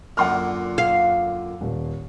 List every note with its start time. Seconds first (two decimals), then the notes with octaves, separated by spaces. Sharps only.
0.17 F#2 A#2 D3 F#5 C6 F6
0.78 F5
1.61 D#1